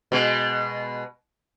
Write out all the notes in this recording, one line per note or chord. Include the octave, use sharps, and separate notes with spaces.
B2 G#3